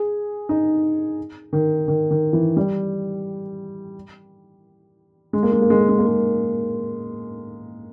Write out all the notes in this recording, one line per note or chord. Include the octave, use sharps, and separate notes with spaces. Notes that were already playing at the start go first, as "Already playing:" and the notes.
Already playing: G#4
D#4
D#3
D#3
D#3
E3
G3
G#3
A#3
G#3
A#3
G#3
A#3
G#3
A#3
G#3